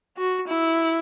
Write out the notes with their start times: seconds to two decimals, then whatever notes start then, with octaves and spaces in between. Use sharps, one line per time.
0.18 F#4
0.48 E4